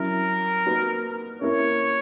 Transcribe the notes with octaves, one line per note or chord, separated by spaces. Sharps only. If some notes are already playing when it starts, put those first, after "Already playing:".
Already playing: F#3 C#4 E4 A#4
A#3 D#4 F#4 B4
A#3 C#4 E4 A#4 C#5